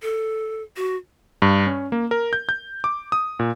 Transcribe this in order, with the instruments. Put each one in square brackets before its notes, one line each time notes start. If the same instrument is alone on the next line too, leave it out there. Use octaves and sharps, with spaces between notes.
[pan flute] A4
F#4
[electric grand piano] G2
C#4
A#3
A#4
G6
G6
D6
D#6
A#2